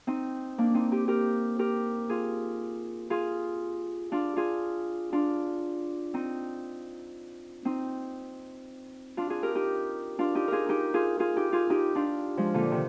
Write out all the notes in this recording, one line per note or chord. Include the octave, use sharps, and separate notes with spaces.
C4 D#4
A#3 D4
C4 D#4
D#4 G4
G4 A#4
G4 A#4
F4 G#4
F4 G#4
D4 F4
F4 G#4
D4 F4
C4 D#4
C4 D#4
D4 F4
F4 G#4
G4 A#4
D#4 G4
D4 F4
D#4 G4
F4 G#4 A#4
D#4 G4
F4 G#4
F4 G#4
D#4 G4
F4 G#4
D#4 G4
D4 F4
F3 G#3
A#2 D3
C3 D#3